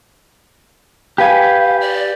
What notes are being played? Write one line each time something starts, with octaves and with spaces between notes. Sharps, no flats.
G4 B4 F5 G#5
D5